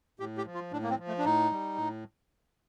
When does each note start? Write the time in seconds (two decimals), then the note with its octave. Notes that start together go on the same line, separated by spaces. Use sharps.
0.20 A2 G4
0.37 G4
0.46 F3
0.54 F4
0.72 A2 D4
0.83 A#3
0.90 C4
0.99 F3
1.08 A3
1.18 D4
1.25 A2 D#4
1.52 G3
1.78 A2